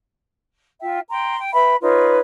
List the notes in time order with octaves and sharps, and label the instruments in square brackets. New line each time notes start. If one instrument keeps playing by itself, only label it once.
[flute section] F4 E5 G5
G5 A#5 C6
G5
B4 E5 G5 B5
D#4 F4 B4 C#5